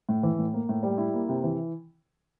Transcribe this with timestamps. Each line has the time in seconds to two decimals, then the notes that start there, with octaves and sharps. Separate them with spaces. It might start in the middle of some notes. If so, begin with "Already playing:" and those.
0.09 A2
0.23 E3
0.39 A2
0.54 A#3
0.69 A2
0.83 G3
0.98 E4
1.14 A#3
1.29 C3
1.44 E3